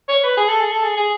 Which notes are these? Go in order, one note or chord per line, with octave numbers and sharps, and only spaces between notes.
C#5
B4
G#4
A4
G#4
A4
G#4
G#4